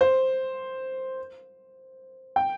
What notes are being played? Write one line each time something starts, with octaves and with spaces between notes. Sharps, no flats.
C5
G5